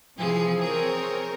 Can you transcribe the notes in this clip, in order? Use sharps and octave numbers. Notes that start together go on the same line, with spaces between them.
C3 E3 F3 G#4
C4 G#4 A#4 C#5